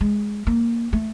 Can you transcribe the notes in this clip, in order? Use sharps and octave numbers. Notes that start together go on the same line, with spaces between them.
G#3
A#3
A3